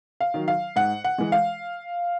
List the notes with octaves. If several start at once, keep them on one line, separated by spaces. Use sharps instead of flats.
F5
D#3 F#3
F5
G#2 F#5
F#5
E3 G#3
F5